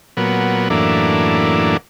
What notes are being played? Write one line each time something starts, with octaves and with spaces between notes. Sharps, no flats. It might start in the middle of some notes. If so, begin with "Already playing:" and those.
A#2 F#3 B3
F#2 A2 E3 A#3 D4